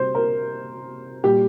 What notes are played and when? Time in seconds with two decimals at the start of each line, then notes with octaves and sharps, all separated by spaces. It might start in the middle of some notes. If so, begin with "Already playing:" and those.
Already playing: C3 G3 C5
0.15 A#4
1.24 A#2 G3 G4